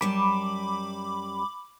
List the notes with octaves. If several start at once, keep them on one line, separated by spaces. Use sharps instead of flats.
F#2 G3 A5 B5 D6